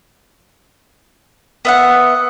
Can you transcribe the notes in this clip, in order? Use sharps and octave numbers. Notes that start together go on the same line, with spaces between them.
B3 E5 F#5